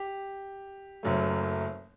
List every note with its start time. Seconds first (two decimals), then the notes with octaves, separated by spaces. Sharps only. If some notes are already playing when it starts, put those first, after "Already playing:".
Already playing: G4
1.03 F#1 F#2 F#3 A3